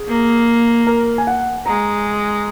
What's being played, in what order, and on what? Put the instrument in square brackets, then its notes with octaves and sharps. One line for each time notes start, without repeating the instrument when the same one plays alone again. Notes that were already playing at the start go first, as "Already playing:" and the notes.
Already playing: [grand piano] G#4
[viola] A#3
[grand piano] A#4
G#5
F#5
[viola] G#3 [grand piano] A#5